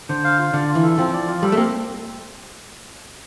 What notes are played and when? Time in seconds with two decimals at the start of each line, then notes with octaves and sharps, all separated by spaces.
0.09 D3 C5
0.24 F5
0.38 F4
0.53 D3 D5
0.68 F4
0.75 E3
0.83 A4
0.98 F3 C4
1.13 D5
1.27 F4
1.43 G3 A4
1.52 A3
1.57 A#3 C4